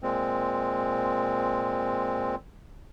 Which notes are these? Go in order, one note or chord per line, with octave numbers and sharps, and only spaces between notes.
A#2 G#3 C4